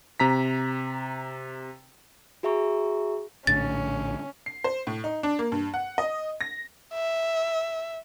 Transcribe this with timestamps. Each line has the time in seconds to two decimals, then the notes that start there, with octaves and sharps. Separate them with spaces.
0.20 C3 A#5 B6
2.43 F#4 G#4 E5 A#5 C#6
3.47 A#1 A2 D3 C#4 A6
4.46 C7
4.64 C5
4.87 A2
5.04 D#4
5.23 D4
5.39 A#3
5.52 G2
5.74 F#5
5.98 D#5
6.41 A#6
6.94 E5